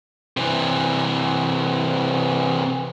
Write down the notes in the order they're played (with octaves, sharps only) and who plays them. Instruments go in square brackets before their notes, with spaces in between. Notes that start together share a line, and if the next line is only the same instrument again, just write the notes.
[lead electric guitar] C3 E3